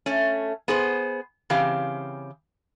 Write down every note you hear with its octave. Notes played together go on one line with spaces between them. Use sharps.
A3 C#4
B3 G#4 C5
C#3 E3 C4 G4 F5